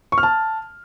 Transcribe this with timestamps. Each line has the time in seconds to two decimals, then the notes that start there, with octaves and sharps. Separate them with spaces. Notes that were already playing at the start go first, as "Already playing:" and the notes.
0.12 C#6
0.18 F6
0.23 A5